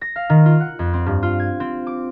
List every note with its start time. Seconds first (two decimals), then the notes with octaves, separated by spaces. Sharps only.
0.01 A#6
0.16 F5
0.30 D#3
0.45 F4
0.60 F#5
0.79 F2
0.94 C4
1.06 G2
1.23 F4
1.39 G#6
1.60 C4
1.87 D6